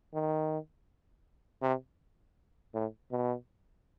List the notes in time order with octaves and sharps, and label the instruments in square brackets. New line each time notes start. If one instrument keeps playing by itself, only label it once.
[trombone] D#3
C3
A2
B2